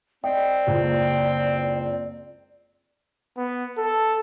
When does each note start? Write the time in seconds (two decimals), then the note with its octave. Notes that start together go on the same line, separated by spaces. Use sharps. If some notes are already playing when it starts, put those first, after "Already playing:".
0.24 C4 D5 D#5 G5
0.67 F#1 C#2 C5
3.38 B3
3.78 A4